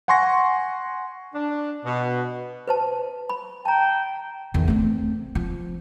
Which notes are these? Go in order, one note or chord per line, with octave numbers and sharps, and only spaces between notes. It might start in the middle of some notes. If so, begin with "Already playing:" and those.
F#5 G#5 C6 C#6 A#6
D4
B2
B4 C5 A5
B5
G5 A5 A#5
E2 D#3
A3 C4
F3